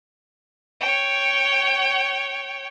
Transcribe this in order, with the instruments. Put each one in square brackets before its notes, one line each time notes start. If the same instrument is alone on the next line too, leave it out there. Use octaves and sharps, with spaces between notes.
[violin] C#5 G5